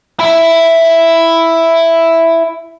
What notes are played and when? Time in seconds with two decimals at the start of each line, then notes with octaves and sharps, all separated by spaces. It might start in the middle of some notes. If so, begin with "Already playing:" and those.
0.20 E4 E5